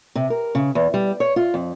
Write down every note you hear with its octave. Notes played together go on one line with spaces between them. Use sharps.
C3
A#4
C#3
E2
G3
C#5
F4
F2